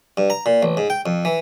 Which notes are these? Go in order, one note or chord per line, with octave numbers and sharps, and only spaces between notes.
G2
A#5
A#2
A1
G#2
G5
F2
E3